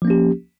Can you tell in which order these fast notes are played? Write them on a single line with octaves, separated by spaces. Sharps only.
F3 A#3 C#4 G4